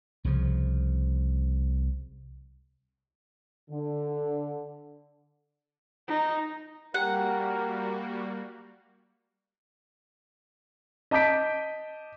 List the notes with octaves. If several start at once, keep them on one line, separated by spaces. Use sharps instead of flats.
C2 C#3 F3
D3
D#4
G3 A#3 F#4 G4 A#4 F#5 G5
D#5 A5 D6 G6 B6 D7